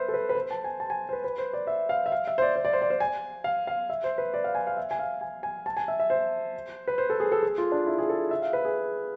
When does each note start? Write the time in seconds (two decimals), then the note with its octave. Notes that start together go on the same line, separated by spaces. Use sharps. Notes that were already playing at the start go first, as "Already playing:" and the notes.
Already playing: B4 C5 E5
0.08 A4
0.14 B4
0.29 B4
0.35 C5
0.51 A5
0.64 G#5
0.80 A5
0.90 G#5
1.09 C5
1.13 B4
1.24 B4
1.38 C5
1.53 D5
1.67 E5
1.89 F5
2.06 E5
2.12 F5
2.27 E5
2.38 C5
2.42 D5
2.56 C5
2.65 D5
2.73 C5
2.82 D5
2.90 C5
3.00 G#5
3.44 F5
3.67 F5
3.90 E5
4.04 C5
4.18 B4
4.34 D5
4.44 F5
4.55 G#5
4.67 F5
4.77 E5
4.91 G#5
4.99 F5
5.21 G#5
5.43 G#5
5.66 A5
5.77 G#5
5.88 E5
6.00 E5
6.10 C5
6.88 B4
6.98 C5
7.10 A4
7.20 G#4
7.32 A4
7.43 G#4
7.58 F4
7.72 D4
7.87 E4
7.98 G#4
8.10 A4
8.31 E5
8.42 F5
8.53 B4
8.65 G#4